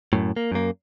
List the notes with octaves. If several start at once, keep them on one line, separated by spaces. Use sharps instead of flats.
F#2 A2
A#3
F#2 A#3